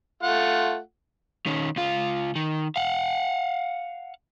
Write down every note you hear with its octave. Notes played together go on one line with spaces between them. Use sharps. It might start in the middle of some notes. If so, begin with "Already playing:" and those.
A3 F4 F#5
D#3 C#4
C#2 F4
D#3
F5 F#5